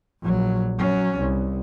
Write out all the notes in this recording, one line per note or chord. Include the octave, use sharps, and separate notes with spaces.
A#1 F#3
F#3 C#4
C2